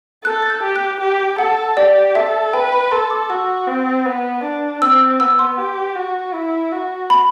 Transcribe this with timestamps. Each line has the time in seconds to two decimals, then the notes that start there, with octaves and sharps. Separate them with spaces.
0.24 A4 F#6
0.42 A6
0.50 G6
0.63 G4
0.76 F#6
1.01 G4
1.38 A4 F#5
1.77 G4 D5
2.15 A4 E5
2.53 B4 G5
2.72 B5
2.91 A4 C6
3.10 D6
3.30 F#4 E6
3.67 C4
4.05 B3
4.44 D4
4.82 C4 E6
5.20 B3 E6
5.39 C6
5.58 G4
5.96 F#4
6.34 E4
6.72 F#4
7.10 B5